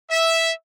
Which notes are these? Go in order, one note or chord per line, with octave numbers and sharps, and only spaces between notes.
E5